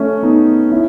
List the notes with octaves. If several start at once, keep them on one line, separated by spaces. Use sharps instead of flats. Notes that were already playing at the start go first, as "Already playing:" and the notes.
Already playing: A3 C#4
B3 D#4
C#4 E4